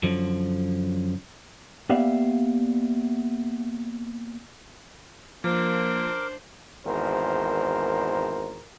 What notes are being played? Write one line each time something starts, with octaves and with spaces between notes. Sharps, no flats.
F#2 D3 F3
A#3 B3 G4 D5 E5 F5
F3 A#3 D4 A#4 C5 D6
G#1 E2 A#4 C5